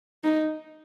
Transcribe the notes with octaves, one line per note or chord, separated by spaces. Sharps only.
D#4